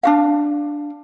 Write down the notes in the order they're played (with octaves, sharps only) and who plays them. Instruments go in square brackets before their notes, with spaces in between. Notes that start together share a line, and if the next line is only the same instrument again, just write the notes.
[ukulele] D4 F#4 F5